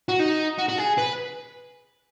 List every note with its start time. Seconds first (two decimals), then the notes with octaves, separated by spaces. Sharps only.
0.09 F#4
0.20 D#4
0.59 F#4
0.69 F#4
0.78 G#4
0.98 B4